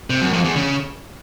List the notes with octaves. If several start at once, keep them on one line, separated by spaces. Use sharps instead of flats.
C3
F#2
F2
E2
C#3